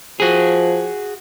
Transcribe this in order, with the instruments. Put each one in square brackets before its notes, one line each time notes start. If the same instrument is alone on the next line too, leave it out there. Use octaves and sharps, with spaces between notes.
[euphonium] F3 [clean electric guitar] F#4 G#4